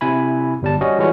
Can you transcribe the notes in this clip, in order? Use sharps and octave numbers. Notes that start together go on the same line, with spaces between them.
C3 E4 G#5 B5
G1 G3 A5
G3 C#4 F#4 D#5
E3 G3 G#3 C#4 F4 F#4